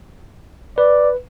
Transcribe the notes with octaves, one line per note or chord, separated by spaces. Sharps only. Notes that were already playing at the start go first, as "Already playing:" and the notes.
B4 D5